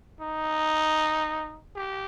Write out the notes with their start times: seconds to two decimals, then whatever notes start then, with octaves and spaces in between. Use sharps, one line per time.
0.20 D#4
1.76 G4